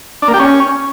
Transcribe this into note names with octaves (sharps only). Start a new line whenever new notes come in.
D4
A#3
G4
C#4